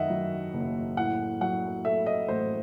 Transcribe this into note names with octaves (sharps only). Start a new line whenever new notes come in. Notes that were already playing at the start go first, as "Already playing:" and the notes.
Already playing: F#2 D#3 D#5 E5 F#5
F#3
F#1
A2 F#5
F#3 F#5
A3 E5
D#5
A1 C5